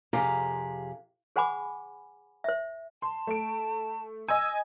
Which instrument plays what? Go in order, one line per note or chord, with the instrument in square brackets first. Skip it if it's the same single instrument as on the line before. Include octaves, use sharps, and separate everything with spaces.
[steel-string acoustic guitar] F2 C3 G4 G#4 F5 A#5
[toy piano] G#4 C5 F#5 G#5 B5 D6
C5 E5
[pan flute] A5 [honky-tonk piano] C6
[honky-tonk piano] A3 D7
[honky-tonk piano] D#5 G#5 [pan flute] E6